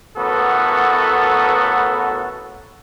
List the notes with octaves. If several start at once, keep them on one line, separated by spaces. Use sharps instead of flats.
A1 A2 B3 F#4 A4 A#4